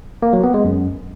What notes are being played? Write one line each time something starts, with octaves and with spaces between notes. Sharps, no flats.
A#3
F#3
B3
G#3
F#2